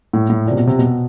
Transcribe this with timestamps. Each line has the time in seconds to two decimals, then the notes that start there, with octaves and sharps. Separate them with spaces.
0.13 A2
0.30 A2
0.46 A#2
0.51 C3
0.57 B2
0.67 C3
0.79 B2